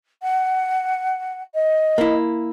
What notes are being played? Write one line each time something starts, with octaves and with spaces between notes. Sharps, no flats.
F#5
D#5
A#3 E4